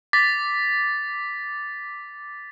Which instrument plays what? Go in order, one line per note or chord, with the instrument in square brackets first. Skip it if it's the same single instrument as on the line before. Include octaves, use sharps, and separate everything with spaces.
[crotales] D6 A6 B6